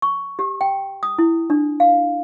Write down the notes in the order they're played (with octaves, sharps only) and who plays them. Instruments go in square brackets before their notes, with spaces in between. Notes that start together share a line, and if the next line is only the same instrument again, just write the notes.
[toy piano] C#6
G4
G5
D#6
E4
D4
F5